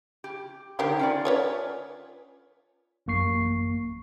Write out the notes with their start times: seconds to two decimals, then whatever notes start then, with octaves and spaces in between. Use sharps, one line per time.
0.24 G4
0.79 D3 D#3 G4 A#4 C5 G5
0.99 C#4 F4 D5
1.25 B4 C#5 G#5
3.06 A1 F#2 A#3 C#6 C7